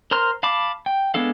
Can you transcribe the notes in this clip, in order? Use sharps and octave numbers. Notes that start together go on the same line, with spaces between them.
A#4 C5 A#5 C6 F6
F5 A5 B5 D6
G5
G#3 B3 D4 A4 F5